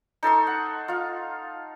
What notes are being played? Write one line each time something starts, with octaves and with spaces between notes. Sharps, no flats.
D#4 A4 C6 C#6
F#5
F4 F5